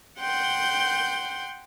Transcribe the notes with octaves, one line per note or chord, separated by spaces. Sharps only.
F#5 G5 C6 G6